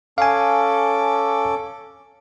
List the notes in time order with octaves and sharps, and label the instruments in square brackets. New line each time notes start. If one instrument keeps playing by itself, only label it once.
[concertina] C#4 A4 D6 [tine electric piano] F5 G#5